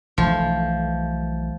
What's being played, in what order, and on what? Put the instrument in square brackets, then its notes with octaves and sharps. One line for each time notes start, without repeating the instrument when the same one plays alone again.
[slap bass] B1 E3 A3 [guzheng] F3